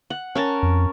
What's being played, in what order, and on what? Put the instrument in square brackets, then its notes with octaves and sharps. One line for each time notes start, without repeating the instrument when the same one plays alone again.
[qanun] F#5
C#4 A#4 A5
[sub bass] F2